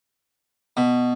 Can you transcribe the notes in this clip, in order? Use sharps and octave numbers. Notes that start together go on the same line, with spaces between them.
B2